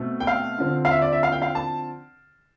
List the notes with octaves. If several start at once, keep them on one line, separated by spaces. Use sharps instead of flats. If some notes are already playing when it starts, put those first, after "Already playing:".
Already playing: B2 A3 C4
G5
F5
D3 F3 C4
F5
E5
D5
E5
F5
G5
F5
A5